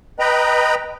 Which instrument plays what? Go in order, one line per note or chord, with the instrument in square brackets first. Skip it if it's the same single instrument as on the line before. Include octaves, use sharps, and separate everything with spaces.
[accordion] B4 D#5 G5 A#5 B5